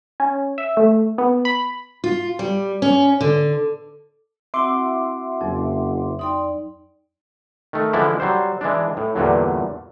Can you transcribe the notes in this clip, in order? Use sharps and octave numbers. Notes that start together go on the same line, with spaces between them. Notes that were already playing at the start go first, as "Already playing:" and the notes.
C#4
E5
A3
B3
B5
F4
G3
C#4
D3
C4 E4 F#4 E5 F#5 C6 D6
F#1 F2 F#3
D#4 D5 G5 C6 D#6
D#3 A3
D3 E3 F3 G#3 D4 E4
F#3 G3 C5
E3 G#3 D4
A2
E2 G2 A#2 D3 F#3